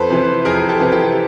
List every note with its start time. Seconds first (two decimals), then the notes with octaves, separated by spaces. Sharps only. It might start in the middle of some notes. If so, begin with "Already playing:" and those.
Already playing: F2 A4 B4 C5
0.10 C3 E3
0.45 F2 G#4 A#4
0.57 G#4
0.69 G4 A4
0.80 C3 E3
0.92 G4 A4